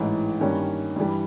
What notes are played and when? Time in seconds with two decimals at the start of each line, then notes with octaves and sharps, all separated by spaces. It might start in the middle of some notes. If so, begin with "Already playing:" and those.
Already playing: A1 G#2 E3
0.40 G2 D#3 G3 A#3 C#4
0.96 G2 E3 G3